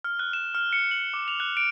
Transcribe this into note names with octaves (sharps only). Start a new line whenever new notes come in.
F6
F#6
E7
F6
C#7
F#7
D6
F7
F#6
D7